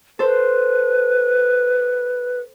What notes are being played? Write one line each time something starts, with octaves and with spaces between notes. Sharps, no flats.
A4 B4 C5